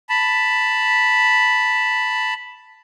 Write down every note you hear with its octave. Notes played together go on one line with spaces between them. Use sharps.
A5 B5